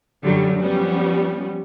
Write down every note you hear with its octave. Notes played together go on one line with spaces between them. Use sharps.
F#2 D3 F#3 G3
F3 G3 B3 C#4